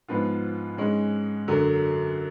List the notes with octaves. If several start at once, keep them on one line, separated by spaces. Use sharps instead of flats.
G#2 F3 B3 F4
G#2 G#3 C#4
F#2 D3 F#3